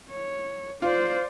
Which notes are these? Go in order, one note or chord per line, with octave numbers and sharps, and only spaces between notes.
C#5
F4 C5 D5